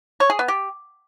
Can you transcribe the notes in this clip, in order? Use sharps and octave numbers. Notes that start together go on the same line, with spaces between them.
C#5
G#4
B3
G4